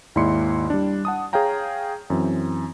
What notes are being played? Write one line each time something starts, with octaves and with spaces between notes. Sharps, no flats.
D#2 G#2 E4 D5 C6 C#7
G3 D4
F#5 A5 D#6
G#4 C#5 F5 G5 A#5
F#2 E3 C4